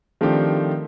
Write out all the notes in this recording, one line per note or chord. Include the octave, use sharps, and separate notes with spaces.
D#3 F3 A3 C4 D4 G4